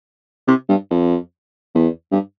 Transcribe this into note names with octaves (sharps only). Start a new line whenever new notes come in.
C3
G2
F2
E2
G2